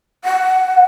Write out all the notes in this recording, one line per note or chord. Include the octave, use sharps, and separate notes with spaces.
F#5